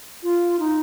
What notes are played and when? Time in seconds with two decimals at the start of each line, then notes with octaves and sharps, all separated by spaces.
0.23 F4
0.59 D#4